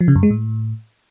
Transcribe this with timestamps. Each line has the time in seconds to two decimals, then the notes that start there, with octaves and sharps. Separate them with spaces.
0.01 F3
0.08 C#3
0.15 F#2
0.23 G#3
0.30 A2